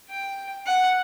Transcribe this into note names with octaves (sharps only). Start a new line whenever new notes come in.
G5
F#5